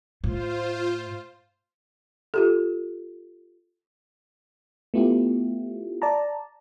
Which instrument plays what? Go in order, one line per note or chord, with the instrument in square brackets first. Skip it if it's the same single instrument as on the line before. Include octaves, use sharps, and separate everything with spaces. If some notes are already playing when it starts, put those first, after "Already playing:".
[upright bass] A2 [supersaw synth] F4 C5
[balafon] F4 G4 A4
[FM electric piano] A3 B3 E4 F4 G4
D5 A5 A#5